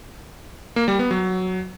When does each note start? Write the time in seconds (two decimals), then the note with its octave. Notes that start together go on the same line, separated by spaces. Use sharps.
0.76 A#3
0.88 G3
0.99 B3
1.11 F#3